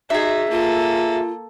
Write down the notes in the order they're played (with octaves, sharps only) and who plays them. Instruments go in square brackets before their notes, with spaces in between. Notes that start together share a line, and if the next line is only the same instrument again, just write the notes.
[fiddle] D#4 [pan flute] F#4 [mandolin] G#4 E5
[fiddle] A#3 A4 [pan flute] F4